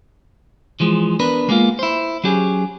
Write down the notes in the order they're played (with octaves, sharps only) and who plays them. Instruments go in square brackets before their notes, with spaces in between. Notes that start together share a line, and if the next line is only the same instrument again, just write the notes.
[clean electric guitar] E3 F3 G#3
B3 D4 A#4 B4
G#3 A#3 B3 D#4 F4
E4 C5
F#3 C#4 G4 G#4